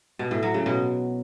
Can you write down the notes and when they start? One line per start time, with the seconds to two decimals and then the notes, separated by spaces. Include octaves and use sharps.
0.19 B2
0.31 A2
0.43 F#3
0.54 C#3
0.66 B2